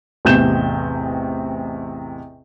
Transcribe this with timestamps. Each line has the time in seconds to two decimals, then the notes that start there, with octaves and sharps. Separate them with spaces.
0.25 A1 E2 C3 G6 E7